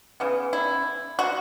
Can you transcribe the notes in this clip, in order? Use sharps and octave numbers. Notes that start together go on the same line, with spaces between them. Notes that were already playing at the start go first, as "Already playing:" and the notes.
C#3 E3 B3
E4
F#4